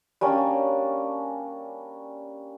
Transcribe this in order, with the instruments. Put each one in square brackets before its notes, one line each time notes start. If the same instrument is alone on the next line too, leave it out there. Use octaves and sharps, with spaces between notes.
[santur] G3 A#3 C#4 D4